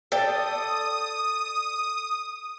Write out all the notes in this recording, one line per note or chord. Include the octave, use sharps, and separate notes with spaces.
A4 D5 G5 D#6